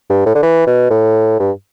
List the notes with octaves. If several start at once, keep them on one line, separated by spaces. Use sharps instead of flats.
G2
A2
D3
E3
B2
A2
G2